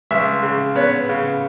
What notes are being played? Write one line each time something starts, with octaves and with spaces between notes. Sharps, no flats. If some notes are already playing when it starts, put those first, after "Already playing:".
C#2 E5
C#3
B3 C#5
C#3